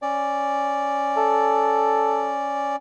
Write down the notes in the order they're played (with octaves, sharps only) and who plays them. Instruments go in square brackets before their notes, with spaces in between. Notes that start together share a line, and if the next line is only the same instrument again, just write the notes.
[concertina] C#4 D5
[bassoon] A4